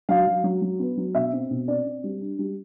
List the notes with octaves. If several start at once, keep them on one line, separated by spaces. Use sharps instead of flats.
F#3 F5
F#3
F#3
F#3
B3
F#3
B2 E5
C4
B2
C4 D5
C4
G3
D4
G3